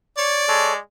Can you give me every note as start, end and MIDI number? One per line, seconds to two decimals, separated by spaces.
0.18 0.48 73
0.18 0.77 74
0.48 0.81 56
0.48 0.73 69
0.48 0.73 73